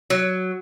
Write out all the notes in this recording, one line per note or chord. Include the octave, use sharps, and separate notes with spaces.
F#3